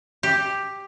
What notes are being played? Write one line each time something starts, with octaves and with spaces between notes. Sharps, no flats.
G4